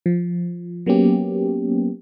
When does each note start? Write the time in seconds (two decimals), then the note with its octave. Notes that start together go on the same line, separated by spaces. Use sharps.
0.06 F3
0.86 F#3 A#3 B3 C#4 G4